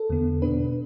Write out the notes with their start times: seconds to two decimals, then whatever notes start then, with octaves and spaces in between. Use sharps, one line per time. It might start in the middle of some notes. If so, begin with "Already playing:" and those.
Already playing: A4
0.09 E2 D3 B3
0.42 B2 B3 D4 B4